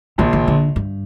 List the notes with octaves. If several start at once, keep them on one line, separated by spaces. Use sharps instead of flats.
A#1 A#2 D#3
D#3
D3
G2